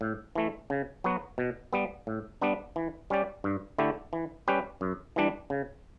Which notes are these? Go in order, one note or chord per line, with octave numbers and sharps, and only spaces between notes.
A2
E3 A3
C#3
F#3 B3 F#4
B2
G3 B3
A2
G3 B3 D4
E3
G3 C#4 G4 D5
G2
D3 A3 E4 G4
E3
G3 C#4 G4 B4
F#2
E3 G3 D4
C#3